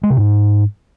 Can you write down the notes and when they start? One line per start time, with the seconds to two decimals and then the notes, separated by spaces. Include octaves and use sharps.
0.03 G#3
0.10 C3
0.17 G#2